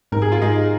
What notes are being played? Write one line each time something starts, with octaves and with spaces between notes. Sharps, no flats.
G#2 A#4
G#4
F4
G#2 D#4 G#4